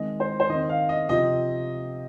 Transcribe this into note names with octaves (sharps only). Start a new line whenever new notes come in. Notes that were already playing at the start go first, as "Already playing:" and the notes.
Already playing: D#3 G#3 C4 D#5
C5
C5
D#3 C4 D#5
F5
D#5
C3 F3 C4 D#5